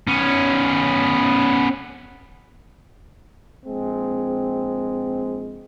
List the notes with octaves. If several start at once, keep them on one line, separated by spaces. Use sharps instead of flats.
B3 C#4
A#1 G#3 C4